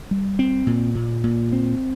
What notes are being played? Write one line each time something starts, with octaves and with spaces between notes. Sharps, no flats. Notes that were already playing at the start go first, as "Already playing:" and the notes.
G3
C4
A#2
A#2
A#2
C4